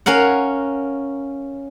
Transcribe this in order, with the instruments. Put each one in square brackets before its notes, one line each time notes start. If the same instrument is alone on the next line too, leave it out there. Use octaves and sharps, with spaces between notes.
[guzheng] C#4 A#4 F5 F#5